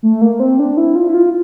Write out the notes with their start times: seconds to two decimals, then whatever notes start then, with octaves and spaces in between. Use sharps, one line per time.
0.03 A3
0.21 A#3
0.40 C4
0.59 D4
0.77 E4
0.96 F4
1.08 E4
1.14 F4